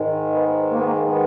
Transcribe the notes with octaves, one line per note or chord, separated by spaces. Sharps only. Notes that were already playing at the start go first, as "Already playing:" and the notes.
Already playing: G#2 D#3 G#3
B3
A#3
B3
A#3
B3